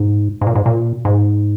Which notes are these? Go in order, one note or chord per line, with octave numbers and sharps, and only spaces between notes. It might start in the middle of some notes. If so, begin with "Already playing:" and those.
Already playing: G#2
G#2
A#2
G#2
A#2
G#2